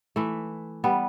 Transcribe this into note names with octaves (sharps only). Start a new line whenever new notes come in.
E3 A3
G3 B3